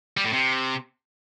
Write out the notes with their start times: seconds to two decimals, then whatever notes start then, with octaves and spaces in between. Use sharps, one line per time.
0.17 G3
0.25 A2
0.33 C3